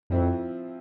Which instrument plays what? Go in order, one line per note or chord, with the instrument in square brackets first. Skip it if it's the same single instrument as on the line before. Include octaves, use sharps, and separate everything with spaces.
[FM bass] F2 [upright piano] F3 C4 E4